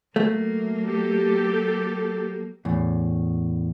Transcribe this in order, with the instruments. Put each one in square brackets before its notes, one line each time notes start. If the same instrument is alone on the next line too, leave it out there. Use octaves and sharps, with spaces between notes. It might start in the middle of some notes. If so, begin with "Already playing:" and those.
[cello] F#3 A#3 [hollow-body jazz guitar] A3
[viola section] G4 A4
[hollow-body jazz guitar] E2 A2